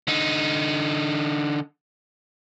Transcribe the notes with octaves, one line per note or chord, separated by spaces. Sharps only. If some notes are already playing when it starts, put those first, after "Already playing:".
D3 D#4